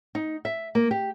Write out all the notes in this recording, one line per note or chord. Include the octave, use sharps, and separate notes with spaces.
D#4
E5
A#3
G4